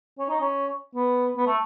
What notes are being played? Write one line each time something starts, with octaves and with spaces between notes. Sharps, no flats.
C#4
D#4
C#4
B3
B3
A3